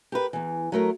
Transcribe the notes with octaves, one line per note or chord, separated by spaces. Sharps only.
G4 A#4 B4
E2 E3
F#3 A3 A#4